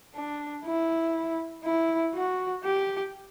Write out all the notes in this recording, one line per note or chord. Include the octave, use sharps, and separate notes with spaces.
D4
E4
E4
F#4
G4